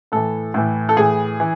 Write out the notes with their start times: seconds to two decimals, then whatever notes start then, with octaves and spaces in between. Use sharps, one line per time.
0.12 A2 E3 A4
0.54 A2 E3
0.89 A4
0.97 A2 E3 G#4
1.40 E3